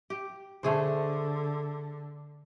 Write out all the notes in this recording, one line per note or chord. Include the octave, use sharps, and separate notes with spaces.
G4
D3 A3 G#4 C5